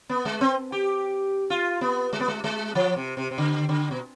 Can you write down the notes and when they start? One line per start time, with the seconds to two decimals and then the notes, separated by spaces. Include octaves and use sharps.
0.09 B3
0.25 G#3
0.41 C4
0.72 G4
1.50 F4
1.81 B3
2.13 G#3
2.20 B3
2.28 G#3
2.44 G#3
2.75 F3
2.96 C3
3.17 C3
3.31 C3
3.38 D3
3.69 D3
3.91 B2